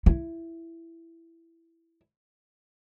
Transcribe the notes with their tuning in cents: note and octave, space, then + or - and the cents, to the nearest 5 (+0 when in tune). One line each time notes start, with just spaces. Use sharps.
E4 +10